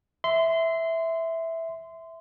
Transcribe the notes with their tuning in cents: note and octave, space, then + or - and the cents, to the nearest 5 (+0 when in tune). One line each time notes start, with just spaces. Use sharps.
E5 -5 C6 -20